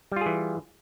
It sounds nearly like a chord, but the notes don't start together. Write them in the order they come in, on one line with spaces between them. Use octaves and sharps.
G3 F4 G#4 E3